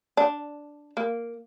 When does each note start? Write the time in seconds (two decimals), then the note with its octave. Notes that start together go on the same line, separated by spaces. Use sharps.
0.17 D4
0.97 A#3